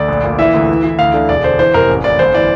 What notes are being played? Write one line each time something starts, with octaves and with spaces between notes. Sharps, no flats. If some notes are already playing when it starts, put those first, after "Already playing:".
Already playing: D2 D5
A#1
A#2
E3 E5
D2
E3
E3
D2 F5
D3
E1 D5
D3 C5
E3 C5
F1 A#4
A1
A1 D5
G1 C5
E3 D5